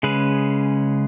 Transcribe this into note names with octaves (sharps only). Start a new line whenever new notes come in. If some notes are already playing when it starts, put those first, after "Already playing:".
C#3 G#3 C#4 G#4 B4